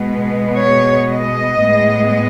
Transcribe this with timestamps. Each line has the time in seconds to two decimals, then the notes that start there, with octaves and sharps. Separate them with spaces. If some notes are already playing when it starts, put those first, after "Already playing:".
Already playing: B2 G#3 B3
0.57 C#5
1.11 D#5
1.65 A2 G#3 B3